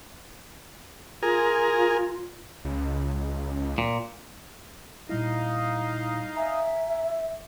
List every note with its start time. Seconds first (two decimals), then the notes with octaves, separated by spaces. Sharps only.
1.23 F4 G#4 A#4
2.65 C#2
3.78 A#2
5.09 A#2 G3 D#4 E4 D#5 F5
6.37 E5 G#5 A#5